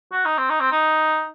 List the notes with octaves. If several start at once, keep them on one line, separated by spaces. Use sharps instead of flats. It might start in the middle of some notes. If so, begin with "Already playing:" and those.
F#4
D#4
C4
D#4
C4
D#4